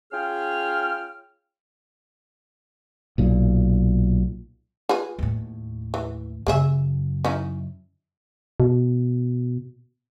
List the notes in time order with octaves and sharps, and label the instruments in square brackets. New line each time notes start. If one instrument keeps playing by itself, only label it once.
[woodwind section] C#4 F4 G#4 G5 F6
[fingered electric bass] B1 A#2
[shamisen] F4 G#4 B4
[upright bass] D#2 A2
[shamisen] E3
[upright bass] F#2 C#3 [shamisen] A#3 G#4 E5
[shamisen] C#4 D#4 E4
[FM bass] B2